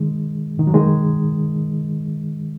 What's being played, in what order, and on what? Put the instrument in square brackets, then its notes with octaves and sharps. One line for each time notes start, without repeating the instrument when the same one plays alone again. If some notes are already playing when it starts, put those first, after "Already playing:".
Already playing: [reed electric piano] D#3 G#3
D#3
F#3
D#3 G#3